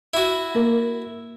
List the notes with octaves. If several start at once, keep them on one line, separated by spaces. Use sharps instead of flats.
E4 F#4
A#3 A#4